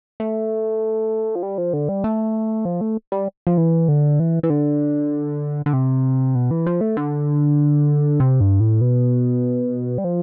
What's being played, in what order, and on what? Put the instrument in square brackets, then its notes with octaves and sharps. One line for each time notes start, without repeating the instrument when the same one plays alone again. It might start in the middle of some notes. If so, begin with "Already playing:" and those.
[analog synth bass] A3
F3
G3
F3
D3
G3
A3
F3
A3
G3
F3
E3
D3
E3
E3
D3
D3
C3
B2
E3
F3
A3
D3
C3
G2
A2
B2
G3
F3